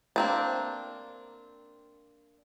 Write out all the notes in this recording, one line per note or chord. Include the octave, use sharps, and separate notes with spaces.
A#3 C4 D4